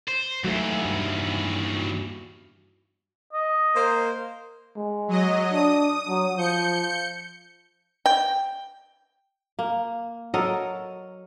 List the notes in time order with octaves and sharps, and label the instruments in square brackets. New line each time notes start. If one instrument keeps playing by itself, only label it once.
[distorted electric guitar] C5
[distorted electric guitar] D#2 E3 [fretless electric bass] F#3 A3 [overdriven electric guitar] F#4 E5
[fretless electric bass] G2
[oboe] D#5
[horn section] A#3 A#4 C5
[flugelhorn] G#3
[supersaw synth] F#3 D#5
[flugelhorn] D4 [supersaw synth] D#6
[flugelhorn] F#3
[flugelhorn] F3 [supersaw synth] G6 C#7
[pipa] G5
[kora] A#3
F#3 A4 A#4 D#5